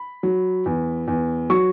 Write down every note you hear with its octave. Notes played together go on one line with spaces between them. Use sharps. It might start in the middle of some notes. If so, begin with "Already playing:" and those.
Already playing: B5
F#3
E2
E2
F#3 C#6